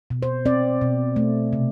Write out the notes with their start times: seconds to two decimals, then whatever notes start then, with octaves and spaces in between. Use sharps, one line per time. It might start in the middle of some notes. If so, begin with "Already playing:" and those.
0.10 B2
0.23 C5
0.46 C4 D5
0.81 B2
1.16 A3
1.53 C3